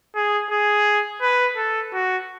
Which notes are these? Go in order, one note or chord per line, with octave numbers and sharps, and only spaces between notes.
G#4
G#4
B4
A4
F#4